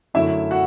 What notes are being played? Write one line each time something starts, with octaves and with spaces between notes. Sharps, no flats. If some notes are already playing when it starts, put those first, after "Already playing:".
F#2 D3 F#3 A3 E4 E5
F#4 F#5